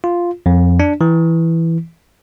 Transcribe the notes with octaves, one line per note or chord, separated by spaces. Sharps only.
F4
F2
D4
E3